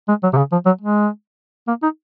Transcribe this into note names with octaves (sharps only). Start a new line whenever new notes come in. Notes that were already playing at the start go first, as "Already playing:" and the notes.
G#3
F#3
C3
C#3
F3
F#3
G#3
A#3
D#4